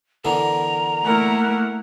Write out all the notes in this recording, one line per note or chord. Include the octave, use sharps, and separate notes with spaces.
D3 E3 B3 A#4 A#5
A3 A#3 E4 A#4 F#5